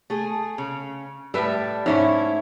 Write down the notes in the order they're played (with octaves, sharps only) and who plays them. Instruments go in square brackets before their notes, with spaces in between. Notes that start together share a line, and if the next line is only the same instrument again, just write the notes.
[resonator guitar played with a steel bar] A3 G#4
C#3
[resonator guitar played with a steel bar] A2 G3 [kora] A4 B4 E5
[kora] G#2 A3 [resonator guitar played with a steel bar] C#4 D#4 E4